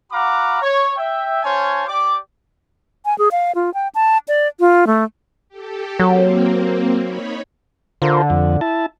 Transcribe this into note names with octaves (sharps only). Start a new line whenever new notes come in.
F#4 F5 F#5 A#5 B5 D6
C#5
E5 G5
C#4 F4 C5 C#5 G#5 A5
G4 D5 D6
G#5
G#4
F5
F4
G5
A5
D5
F4
A3
G4 A4
F#3 A#3 C4
D#4 C#5 B5
D3 F4 A#4 C5
F2
E4 A5